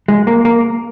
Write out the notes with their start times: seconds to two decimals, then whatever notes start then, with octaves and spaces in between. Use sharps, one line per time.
0.08 G#3
0.27 A#3
0.45 A#3